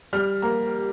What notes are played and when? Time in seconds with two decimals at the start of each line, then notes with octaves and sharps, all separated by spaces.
0.13 G3 F6
0.42 A#3 A#5